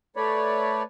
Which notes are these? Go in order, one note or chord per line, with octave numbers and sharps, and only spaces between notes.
A3 B4 C#5 D5